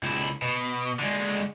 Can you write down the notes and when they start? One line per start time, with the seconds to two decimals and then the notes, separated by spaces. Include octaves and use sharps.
0.03 C#2 E4
0.42 B2
0.99 D3 G#3